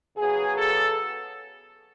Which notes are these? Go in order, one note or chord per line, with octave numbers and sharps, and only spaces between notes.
C#3 F#3 B3 G#4
A4